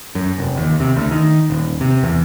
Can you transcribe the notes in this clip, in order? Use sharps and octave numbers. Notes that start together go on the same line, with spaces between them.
F#2
F1
D#2
C3
D2
D#3
D#1
C3
E2